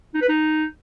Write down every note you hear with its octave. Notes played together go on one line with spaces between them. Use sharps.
D#4
B4
D#4